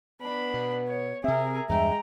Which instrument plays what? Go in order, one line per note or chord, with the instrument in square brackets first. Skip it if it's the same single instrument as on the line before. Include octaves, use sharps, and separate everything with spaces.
[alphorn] B3 [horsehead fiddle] D4 B5
[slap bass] B2
[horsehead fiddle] C#5
[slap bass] C3 C4 [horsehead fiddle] G#4 A#4 [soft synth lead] E5
[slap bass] E2 G2 [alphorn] G#3 [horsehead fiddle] G5 A#5